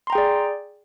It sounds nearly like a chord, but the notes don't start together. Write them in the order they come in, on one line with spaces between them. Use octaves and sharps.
C6 A#5 G5 G#4 D5